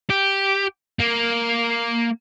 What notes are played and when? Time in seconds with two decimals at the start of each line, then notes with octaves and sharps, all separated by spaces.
0.10 G4
0.99 A#3